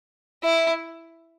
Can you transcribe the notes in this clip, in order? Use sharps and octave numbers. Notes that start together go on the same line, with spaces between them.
E4 E5